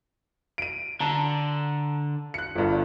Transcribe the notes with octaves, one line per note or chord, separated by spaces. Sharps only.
D7 D#7
D3 A5 A#5
F#6 C#7
G1 G2